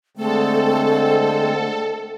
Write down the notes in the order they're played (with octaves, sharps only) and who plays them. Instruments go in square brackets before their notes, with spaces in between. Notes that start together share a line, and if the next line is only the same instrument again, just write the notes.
[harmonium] D3 G#3 C4 [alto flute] A3 [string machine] A4